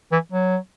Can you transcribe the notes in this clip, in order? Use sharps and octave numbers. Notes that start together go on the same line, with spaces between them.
E3
F#3